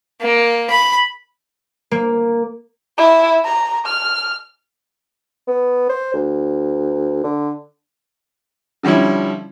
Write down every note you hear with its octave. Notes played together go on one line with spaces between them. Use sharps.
A#3
B5
A#3
E4
A#5
F6
B3
C5
D2
D3
D3 F3 G3 C#4 E4